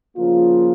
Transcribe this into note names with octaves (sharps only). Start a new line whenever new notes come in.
C#3 F3 A#3 F4